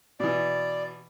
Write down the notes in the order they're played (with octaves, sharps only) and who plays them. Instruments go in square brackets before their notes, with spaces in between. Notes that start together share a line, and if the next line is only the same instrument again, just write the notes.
[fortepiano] B2 E3 [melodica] D5